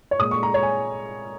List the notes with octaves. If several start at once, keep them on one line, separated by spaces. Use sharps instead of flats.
C#5
A#2 G#3 D#6
C#6
A#5
C#5
G#5